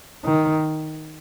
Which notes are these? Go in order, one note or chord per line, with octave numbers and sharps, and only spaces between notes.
D#3